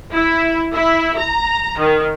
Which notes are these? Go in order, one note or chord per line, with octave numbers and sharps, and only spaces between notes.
E4
E4
A#5
D#3